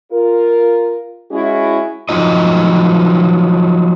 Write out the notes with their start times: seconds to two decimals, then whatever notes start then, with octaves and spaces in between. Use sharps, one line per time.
0.11 F4 A#4
1.31 G#3 C#4 E4 F#4 G#4
2.09 F3 F#3 D#4 F4 D#5